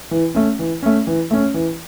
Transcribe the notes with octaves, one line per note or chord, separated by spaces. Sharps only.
E3
A3 C#4
E3
A3 C#4
E3
A3 C#4
E3